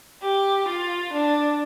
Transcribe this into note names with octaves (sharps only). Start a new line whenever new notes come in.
G4
F4
D4